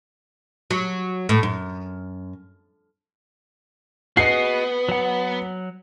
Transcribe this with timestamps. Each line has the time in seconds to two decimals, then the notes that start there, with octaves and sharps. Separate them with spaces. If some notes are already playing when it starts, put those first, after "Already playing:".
0.71 F#3
1.29 A2
1.43 F#2
4.17 B3 F#4 G#4 D#5 C7
4.89 F#3 F#5